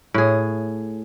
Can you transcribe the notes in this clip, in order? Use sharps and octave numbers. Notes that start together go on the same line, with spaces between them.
A2 G#4